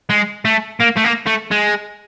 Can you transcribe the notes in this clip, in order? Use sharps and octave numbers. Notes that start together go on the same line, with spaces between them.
G#3
A3
A#3
A3
A#3
A3
G#3